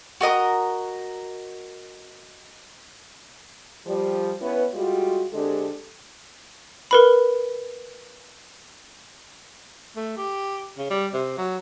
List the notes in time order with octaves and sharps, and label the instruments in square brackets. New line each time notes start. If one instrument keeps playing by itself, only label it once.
[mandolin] F#4 A#4 D#5 A#5
[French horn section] F3 G3
B3 C#4 E4 B4
G3 G#3 F4 F#4
D3 G#3 C4 D4 G4 A4
[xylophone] A#4 B4 B5
[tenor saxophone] A3
G4
C#3
G3
C3
F#3